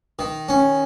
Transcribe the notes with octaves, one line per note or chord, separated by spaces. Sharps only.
D#3
C#4